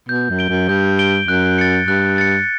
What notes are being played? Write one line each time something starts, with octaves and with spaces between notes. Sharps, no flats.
B2 G6
F#2
D7 G7
F#2
G2 G6
D7 G7
F#2 F#6
A6 C#7
G2 F#6
A6 C#7